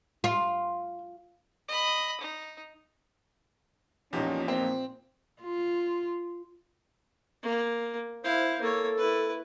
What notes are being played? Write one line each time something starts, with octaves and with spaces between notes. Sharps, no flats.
F4
D#5 B5
D#4
E2 A#2 F3 C#4 D#4 G4
A#3 C4
F4
A#3
E4 C5 F5
A#3 A4 C#5
E4 B4